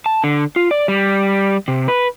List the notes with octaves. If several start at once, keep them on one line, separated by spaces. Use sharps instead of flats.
A5
D3
F4
D5
G3
C3
B4